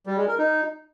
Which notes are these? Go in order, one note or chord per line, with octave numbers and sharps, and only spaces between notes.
G3
G#3
A#4
D#4